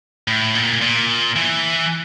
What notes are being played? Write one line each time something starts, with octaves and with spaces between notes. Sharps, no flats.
A2
A#2
A#2
E3